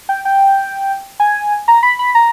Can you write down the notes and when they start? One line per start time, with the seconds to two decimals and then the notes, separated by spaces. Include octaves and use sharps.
0.09 G5
0.25 G5
1.20 G#5
1.68 A#5
1.83 B5
1.99 B5
2.15 A#5